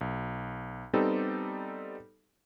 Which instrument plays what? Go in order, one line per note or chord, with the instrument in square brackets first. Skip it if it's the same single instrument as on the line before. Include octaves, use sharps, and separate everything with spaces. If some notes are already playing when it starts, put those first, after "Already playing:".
[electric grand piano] B1
G3 B3 C4 D#4 G4 A4